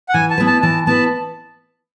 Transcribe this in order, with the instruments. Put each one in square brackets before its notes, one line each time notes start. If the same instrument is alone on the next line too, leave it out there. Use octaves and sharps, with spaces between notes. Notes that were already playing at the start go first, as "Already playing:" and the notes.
[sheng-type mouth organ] F#5
[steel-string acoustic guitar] E3 [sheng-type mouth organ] G#5
[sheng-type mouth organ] A5
[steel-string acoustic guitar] B3 E4 B4
[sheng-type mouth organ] A5
[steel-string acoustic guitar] E3 [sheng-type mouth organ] A5
[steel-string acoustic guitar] B3 E4 B4 [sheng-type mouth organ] A5